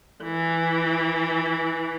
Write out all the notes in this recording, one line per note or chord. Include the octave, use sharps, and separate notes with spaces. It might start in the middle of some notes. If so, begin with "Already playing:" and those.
E3